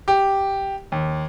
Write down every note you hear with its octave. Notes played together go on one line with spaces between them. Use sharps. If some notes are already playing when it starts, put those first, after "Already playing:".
G4
D#2